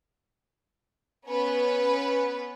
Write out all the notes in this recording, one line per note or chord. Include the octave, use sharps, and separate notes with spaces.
B3 C#4 B4